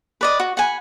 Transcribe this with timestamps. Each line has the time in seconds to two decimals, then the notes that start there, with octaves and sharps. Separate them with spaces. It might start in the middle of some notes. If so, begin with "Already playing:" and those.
0.21 B4 D5 D#5
0.40 F#4
0.57 F#5 G#5 B5